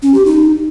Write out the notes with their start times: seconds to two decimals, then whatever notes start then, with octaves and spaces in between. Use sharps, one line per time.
0.03 C#4
0.14 G4
0.26 D#4